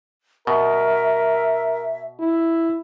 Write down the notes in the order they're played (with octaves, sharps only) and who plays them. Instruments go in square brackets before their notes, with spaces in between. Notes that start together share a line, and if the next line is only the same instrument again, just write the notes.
[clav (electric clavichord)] B2 [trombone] A#4 [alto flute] E5
[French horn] E4